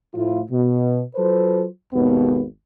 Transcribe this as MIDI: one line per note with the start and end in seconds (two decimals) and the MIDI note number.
0.14 0.40 45
0.14 0.40 53
0.14 0.40 64
0.14 0.40 65
0.51 1.02 47
1.16 1.65 54
1.16 1.65 65
1.16 1.65 69
1.16 1.65 71
1.16 1.65 72
1.93 2.43 32
1.93 2.43 39
1.93 2.43 47
1.93 2.43 59